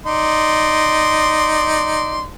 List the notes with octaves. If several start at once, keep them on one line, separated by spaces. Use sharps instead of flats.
D#4 D5 C6